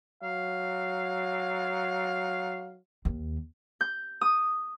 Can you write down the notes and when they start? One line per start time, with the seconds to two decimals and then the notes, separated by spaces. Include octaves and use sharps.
0.23 F#3 F5
3.05 D#2
3.81 G6
4.21 D#6